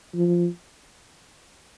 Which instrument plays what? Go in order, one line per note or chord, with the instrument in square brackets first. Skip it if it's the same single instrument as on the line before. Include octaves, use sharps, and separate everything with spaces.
[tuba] F3